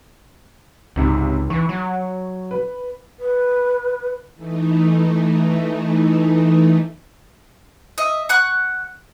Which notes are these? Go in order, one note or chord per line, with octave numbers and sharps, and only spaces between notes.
G#1 C#2 C3
E3 C#6
F#3
B4
B4
E3 A3 D#4
D#5 E5
F#5 C#6 F#6